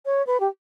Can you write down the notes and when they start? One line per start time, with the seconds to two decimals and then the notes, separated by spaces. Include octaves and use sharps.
0.06 C#5
0.27 B4
0.40 G4